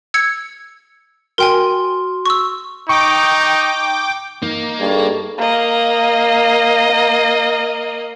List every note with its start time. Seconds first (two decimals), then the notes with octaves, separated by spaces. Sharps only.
0.14 E6 G#6 C#7
1.38 F#4 A#4 G5 G#5 C6 F6
2.26 C#6 E6
2.89 D#4 G5 C#6 D6
4.42 A#3 D#4
4.80 G2 G#4 A4 C#6
5.38 A#3 D#5